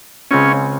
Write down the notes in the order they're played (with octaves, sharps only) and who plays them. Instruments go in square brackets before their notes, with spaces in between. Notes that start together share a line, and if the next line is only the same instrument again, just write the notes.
[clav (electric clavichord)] C#2 C#3 G#3 C4 F4 [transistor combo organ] C#4